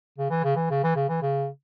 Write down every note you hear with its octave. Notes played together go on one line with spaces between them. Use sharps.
C#3
E3
C#3
E3
C#3
E3
C#3
E3
C#3